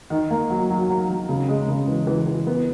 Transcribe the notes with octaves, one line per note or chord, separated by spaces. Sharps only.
D#3
A#3
F#3
F#3
F#3
F#3
C#3
G#3
C#3
E3
E3
E3
B3